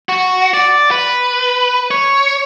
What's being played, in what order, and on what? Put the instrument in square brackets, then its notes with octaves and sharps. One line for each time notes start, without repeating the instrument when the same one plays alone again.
[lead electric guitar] F#4
D5
B4
C#5